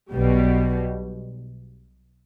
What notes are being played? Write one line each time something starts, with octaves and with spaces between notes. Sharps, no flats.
B1 B2 G3